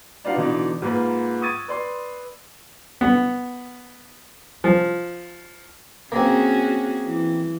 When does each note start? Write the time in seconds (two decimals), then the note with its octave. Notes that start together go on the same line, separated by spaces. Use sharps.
0.24 D4 D#4 F4 B4 F5 F#5
0.36 B2 D3 E3 D4 D#4
0.82 G#2 A#3 F4 B4
1.41 C#6 D#6 E6 G#6 A6 D#7
1.68 B4 D5 C6
3.01 B3
4.64 F3
6.12 A#3 C4 C#4 F#4 G#4
7.06 E3